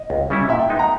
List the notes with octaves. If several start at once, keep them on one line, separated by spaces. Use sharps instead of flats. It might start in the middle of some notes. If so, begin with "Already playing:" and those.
Already playing: D#5
C#2
C#3 G3 C#4 E4
A#2 E5
G5
G#3 B3 D#4
A#5